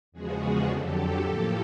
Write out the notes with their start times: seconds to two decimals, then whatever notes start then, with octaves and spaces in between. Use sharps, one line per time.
0.12 E2 C#3 F3 G#3 B3 F#4 G#4
0.67 F2 D3 F#3 G4 A4
1.21 A2 F3 A#3 G4 A4